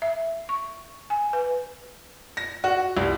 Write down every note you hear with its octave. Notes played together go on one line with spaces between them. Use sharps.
E5
C#6
G#5
B4
A#6
F#4
C2